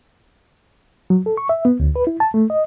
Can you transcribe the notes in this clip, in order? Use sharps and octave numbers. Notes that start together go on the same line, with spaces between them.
F#3
A4
C#6
E5
B3
D2
B4
E4
A5
A3
D#5